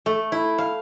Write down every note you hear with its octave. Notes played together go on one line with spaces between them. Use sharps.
A3
E4
F5